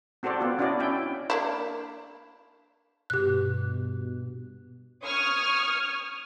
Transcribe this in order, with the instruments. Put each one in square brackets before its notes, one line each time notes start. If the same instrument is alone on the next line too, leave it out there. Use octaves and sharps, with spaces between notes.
[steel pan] C4 F#4 A4 C5 D5
B3 F4
C#4 D4 E4 F#4 D5 D#5
C#4 E4 G5
[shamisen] A#3 D4 E4
[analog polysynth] G2 B2 [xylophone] G4 F#6
[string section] C#6 D#6 F6 G#6